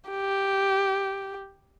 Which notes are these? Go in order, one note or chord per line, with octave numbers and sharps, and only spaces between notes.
G4